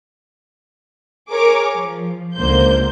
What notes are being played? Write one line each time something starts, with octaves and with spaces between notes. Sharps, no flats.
G#4 A#4 C#5 D6
F3
C#2 D3 A#3 C5 G6